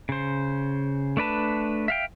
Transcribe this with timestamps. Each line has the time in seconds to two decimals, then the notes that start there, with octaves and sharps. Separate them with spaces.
0.09 C#3 C5
1.17 A3 D4 B4 A5
1.88 E5 F5 G5